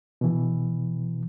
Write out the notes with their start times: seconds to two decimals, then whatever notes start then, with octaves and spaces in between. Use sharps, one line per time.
0.21 B2 E3